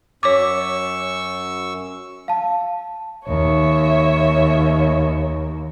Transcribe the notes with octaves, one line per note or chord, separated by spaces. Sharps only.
F#2 C#5 C#6 D6 E6
F5 A5
D#2 C#5 E5